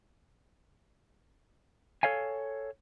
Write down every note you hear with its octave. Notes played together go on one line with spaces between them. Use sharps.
A4 C#5 F5 G#5